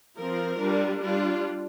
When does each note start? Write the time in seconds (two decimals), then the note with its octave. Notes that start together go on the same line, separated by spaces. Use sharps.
0.16 F3 C4 F4 A#4
0.58 G3 D4 F4
1.01 G3 D4 F4